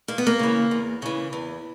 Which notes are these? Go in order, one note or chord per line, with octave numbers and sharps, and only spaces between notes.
E2 A#3
B3
A#3
C#3 E3
E2
C#3 E3
E2